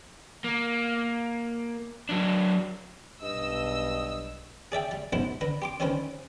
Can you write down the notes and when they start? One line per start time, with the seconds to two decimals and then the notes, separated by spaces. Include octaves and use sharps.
0.44 A#3
2.09 F#3 D4
3.22 B1 G2 D#5 E6
4.72 G#4 D5 E5 G5
4.91 G3
5.13 B1 G#2 E4 C5 F#5
5.41 D3 B4 A#5
5.62 G4 C6 D6
5.80 D3 D#3 G3 C#4 B4 C5